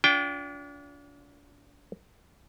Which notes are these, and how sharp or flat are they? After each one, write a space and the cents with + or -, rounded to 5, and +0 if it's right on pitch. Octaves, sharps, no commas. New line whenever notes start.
D4 -35 F4 +25 G5 +0